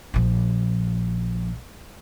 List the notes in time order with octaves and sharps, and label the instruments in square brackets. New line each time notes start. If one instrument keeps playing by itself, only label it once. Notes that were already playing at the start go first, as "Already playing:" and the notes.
[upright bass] A#1 F3